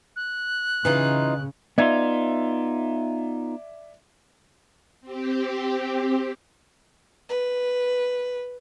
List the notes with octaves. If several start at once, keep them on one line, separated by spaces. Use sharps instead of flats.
F#6
C#3 E3 D#4 F4
B3 D#4 F4 D5 E5 G#6
C4 G4
B4